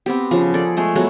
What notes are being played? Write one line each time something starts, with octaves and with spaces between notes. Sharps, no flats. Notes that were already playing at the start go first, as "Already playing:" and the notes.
B3 C4 G4
C#3 F3
G#4 A4 D5
G#3 A3 G#4
F#3 G#3 A3 B3